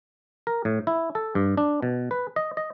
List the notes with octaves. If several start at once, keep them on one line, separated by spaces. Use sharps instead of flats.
A#4
A2
E4
A4
G2
D4
B2
B4
D#5
D#5